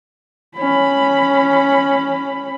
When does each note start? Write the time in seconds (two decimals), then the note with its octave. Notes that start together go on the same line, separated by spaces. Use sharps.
0.58 C#4 B5